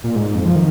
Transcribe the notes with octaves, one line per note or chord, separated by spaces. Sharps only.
A#2
G#2
F2
F3
D#3